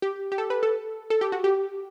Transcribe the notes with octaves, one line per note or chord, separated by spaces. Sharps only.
G4
G4
A4
B4
A4
A4
G4
F#4
G4